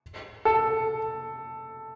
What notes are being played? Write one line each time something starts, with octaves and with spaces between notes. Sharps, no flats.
A4